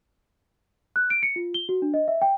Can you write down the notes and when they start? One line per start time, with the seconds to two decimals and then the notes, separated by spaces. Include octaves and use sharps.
0.96 F#6
1.10 D7
1.23 C#7
1.36 F4
1.54 G7
1.69 F#4
1.82 D4
1.94 D#5
2.08 E5
2.22 G5